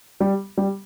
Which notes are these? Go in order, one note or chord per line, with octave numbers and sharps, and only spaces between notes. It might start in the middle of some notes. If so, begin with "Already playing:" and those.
G3
G3